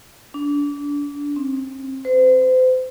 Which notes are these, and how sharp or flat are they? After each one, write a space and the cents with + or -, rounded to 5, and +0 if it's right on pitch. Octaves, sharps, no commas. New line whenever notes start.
D4 -30
C4 +30
C5 -35